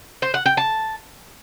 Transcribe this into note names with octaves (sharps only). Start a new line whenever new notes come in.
C5
F#5
G5
A5